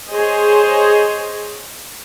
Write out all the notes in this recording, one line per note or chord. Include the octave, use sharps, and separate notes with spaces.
G#4 C5 C#5 D#5